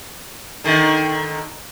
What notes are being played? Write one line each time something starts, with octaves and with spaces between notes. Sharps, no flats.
D3 D#3